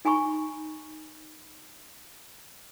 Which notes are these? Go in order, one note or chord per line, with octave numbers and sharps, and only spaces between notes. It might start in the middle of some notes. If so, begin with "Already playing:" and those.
D#4 G#5 A#5 B5 C#6